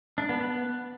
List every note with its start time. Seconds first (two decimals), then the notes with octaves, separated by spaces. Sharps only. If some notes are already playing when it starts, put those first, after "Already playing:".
0.18 D4
0.29 B3
0.41 B3